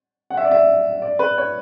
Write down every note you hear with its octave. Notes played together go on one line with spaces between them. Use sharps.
F#5
E5
D5
E5
D5
B4
C#5